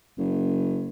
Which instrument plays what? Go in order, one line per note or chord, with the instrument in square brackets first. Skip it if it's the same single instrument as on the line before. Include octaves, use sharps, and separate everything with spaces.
[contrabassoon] F#1